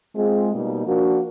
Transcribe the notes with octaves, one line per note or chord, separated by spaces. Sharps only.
G#3 C4 F4 G#4
B2 G3 A#3 D#4
F3 A#3 D4 F#4